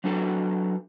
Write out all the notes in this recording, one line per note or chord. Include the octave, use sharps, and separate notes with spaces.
F#3 D4 F#4 A4 B4